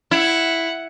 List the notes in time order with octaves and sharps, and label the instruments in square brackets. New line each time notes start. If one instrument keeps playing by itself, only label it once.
[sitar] E4 [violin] F#5